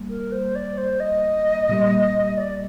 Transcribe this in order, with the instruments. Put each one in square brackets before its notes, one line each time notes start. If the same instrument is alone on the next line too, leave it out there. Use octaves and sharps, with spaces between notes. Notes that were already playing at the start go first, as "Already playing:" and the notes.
Already playing: [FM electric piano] G3 A#3
[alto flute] A#4
C5
D5
C5
D#5
[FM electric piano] A#2 G3 A#3
[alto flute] D5